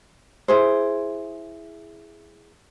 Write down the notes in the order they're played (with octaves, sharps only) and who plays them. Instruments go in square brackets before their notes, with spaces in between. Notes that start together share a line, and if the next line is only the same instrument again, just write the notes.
[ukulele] E4 G#4 C5